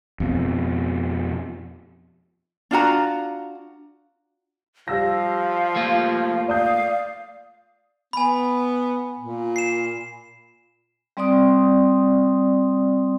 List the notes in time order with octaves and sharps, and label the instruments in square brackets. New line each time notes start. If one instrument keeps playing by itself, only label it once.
[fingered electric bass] F2 B2
[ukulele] D4 F4 F#4 A#5
[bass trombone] F3 [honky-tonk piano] G3 E6 A#6 [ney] F5
[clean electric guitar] A3 A#3 F4
[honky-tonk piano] D5 D#6 G6 [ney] F5
[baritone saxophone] B3 [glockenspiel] G#5 B5
[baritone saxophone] A#2
[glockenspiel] C7 E7
[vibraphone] G3 C4 D5 C6 D#6